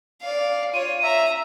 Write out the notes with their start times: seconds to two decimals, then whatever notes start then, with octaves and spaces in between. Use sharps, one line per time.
0.22 D5 F5
0.74 F4 C#5 D#7
1.02 E5 A#5